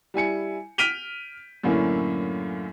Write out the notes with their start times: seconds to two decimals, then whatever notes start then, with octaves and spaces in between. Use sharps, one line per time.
0.14 G3 E4 G#5 C#7
0.78 F6 B6 D7 D#7 F7 G7
1.64 F#2 A2 D3 A#3 C#4 E4